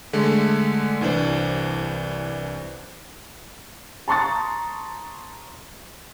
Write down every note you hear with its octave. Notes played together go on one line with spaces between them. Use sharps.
D3 G#3 A3
C2 E3 D4 C5
A5 A#5 C6 C#6 D#6 A6